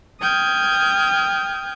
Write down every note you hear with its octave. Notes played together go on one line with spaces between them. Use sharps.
G5 D#6 F6 G6 G#6